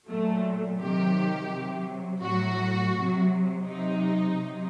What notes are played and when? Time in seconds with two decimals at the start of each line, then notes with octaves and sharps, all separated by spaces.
0.08 A#2 F#3 A3
0.80 C3 D#3 F#3 G4
1.52 C3 F#3
2.22 A2 F#3 F#4
2.94 C3 F#3
3.65 C3 F#3 D#4
4.36 C3 F#3